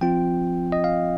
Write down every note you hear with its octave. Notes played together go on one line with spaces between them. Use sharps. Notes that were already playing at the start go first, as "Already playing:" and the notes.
F3 C4 F4 G5
D#5
F5